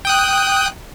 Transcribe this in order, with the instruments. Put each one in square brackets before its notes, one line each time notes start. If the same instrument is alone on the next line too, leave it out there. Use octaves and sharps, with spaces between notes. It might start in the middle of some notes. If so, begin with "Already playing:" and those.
[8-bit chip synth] G5 D#6 F#6